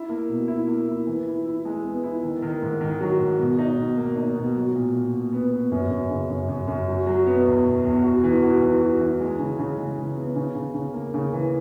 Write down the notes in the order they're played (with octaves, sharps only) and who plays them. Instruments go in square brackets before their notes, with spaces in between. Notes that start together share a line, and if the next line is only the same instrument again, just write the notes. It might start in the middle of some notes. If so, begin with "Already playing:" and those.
Already playing: [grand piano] E4
A#3
B2
E4
A#3
E4
E3
E4
E4
G#3
B3
E4
D#3
D#3
G#2
D#3
F#3
G#2
B2
D#4
B2
A#3
D#4
B2
F#3
A#2
A#2
A#2
B3
B3
F#2
F#2
C#3
F#2
F#2
F#2
F#3
F#3
B3
E2
B2
E2
F#4
E3
F#4
E3
F#4
E3
G#3
C#3
C#3
G#3
C#3
B3
C#3
C#3
C#3
A#3
C#3
E3